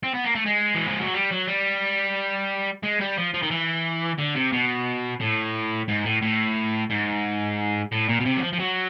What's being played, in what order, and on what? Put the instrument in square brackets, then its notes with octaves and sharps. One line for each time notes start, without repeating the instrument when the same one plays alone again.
[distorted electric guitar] C4
B3
A#3
A3
G#3
E3
F3
F#3
G3
F#3
G3
G#3
G3
F3
F3
D#3
E3
D3
C3
B2
A2
G#2
A2
A2
G#2
A2
A#2
B2
C3
F#3
F3
F3
F#3